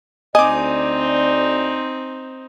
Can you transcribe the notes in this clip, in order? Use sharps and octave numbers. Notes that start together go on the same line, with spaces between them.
D2 C4 D#4 D5 D#5 G#5 D6